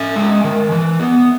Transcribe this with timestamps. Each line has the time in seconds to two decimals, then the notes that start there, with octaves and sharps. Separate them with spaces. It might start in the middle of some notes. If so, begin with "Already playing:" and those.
Already playing: C#4 E5 G#5
0.16 G#3
0.44 D#3
0.72 E3
1.00 B3